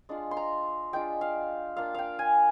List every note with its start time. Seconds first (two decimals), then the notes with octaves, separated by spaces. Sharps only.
0.09 G#3 D4 F4
0.31 C6
0.37 A#5
0.93 G#3 D4 F4 G5
1.21 F5
1.76 A#3 D4 F4 F5
1.94 F5 G5
2.19 G#5